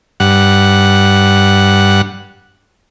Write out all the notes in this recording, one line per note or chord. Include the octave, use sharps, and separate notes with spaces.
G2 F#5